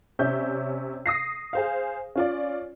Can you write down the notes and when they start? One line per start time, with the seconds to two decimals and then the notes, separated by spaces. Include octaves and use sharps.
0.19 C3 C#4 D5 E5 G6
1.06 D#6 A#6 C7
1.53 G#4 C5 F5
2.16 C#4 F4 D5